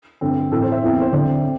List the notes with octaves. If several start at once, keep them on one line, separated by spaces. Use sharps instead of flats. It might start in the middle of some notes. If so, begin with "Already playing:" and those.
G2 D3 A3 C4
A2 E3 A3 C4 A4
C5
E5
E2 E3 C4
C5
D2 D3 C4 D5
C4